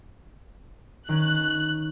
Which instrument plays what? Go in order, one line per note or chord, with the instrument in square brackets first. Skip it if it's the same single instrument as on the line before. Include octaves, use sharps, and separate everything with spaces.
[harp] D#3 C#4 [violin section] F#6